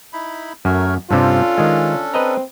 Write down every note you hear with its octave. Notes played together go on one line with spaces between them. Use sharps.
D#4 E4 B5
F#2 A3 A#4 C#5
G2 C3 G3 C#4 D4 F4 A4
D#3 G#3
C4 B4 D#5 A#5